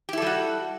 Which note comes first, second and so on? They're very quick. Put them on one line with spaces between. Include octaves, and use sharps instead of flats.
G4 E4 A4 G3 F#4